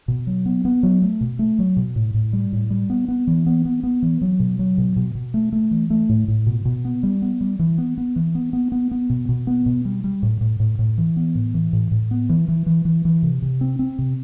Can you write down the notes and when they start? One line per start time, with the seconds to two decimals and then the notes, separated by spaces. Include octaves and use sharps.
0.08 B2
0.27 F#3
0.46 B3
0.65 B3
0.83 F#3
1.02 A3
1.21 B2
1.39 A3
1.59 F#3
1.77 B2
1.96 A2
2.14 A2
2.33 G3
2.52 A2
2.70 G3
2.90 B3
3.08 B3
3.27 E3
3.46 B3
3.65 B3
3.83 B3
4.02 E3
4.21 F#3
4.40 B2
4.59 F#3
4.78 B2
4.96 B2
5.15 B2
5.34 A3
5.52 A3
5.71 E3
5.90 A3
6.09 A2
6.28 A2
6.47 B2
6.65 B2
6.85 B3
7.03 G3
7.22 B3
7.41 G3
7.59 E3
7.78 B3
7.98 B3
8.16 E3
8.35 B3
8.53 B3
8.72 B3
8.91 B3
9.10 B2
9.29 B2
9.47 B3
9.66 B2
9.85 G3
10.04 G3
10.23 A2
10.41 A2
10.60 A2
10.79 A2
10.98 E3
11.16 B3
11.35 A2
11.54 E3
11.73 A2
11.91 A2
12.11 B3
12.29 E3
12.48 E3
12.66 E3
12.85 E3
13.05 E3
13.23 C3
13.42 C3
13.61 C4
13.79 C4
13.99 C3